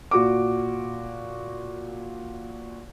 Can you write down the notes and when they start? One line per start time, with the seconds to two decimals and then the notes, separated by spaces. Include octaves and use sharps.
0.11 A#2 F#4 D6